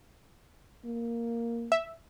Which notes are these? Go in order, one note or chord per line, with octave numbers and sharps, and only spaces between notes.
A#3
E5